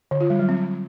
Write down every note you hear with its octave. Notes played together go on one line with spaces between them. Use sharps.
D3
F4
G3
F#3
C4